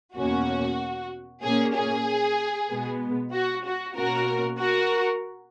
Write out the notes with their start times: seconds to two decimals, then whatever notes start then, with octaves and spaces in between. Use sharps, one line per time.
0.16 E2 B2 A#3 C#4 F#4
1.43 A#2 A#3 C#4 G#4
1.75 G#4
2.70 B2 G#3 B3
3.34 F#4
3.65 F#4
3.96 B2 A#3 C#4 F#4 A#4
4.60 F#4 A#4